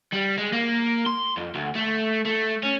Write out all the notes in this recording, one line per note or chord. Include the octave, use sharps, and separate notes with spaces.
G3
G#3
A#3
C6
F2
D2
A3
A3
C#4